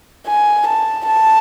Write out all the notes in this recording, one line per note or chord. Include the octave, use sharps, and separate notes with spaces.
G#5
A5
A5